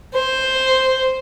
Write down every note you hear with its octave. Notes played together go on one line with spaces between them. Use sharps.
C5